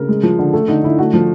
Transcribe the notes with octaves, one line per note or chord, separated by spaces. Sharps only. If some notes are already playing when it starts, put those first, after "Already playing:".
Already playing: C#3 A#4
G#3
F3
D3
A3 A4
D3 D#4
D3 E4
A3 F#4
F3